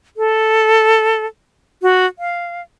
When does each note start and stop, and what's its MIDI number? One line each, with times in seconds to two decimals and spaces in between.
0.17 1.25 69
1.82 2.06 66
2.19 2.62 77